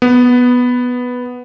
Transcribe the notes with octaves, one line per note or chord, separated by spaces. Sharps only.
B3